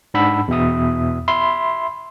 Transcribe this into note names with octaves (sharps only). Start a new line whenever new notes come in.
G#2 D4 F#5 B5 E6
E2 B2 E5 D#6
E5 B5 C6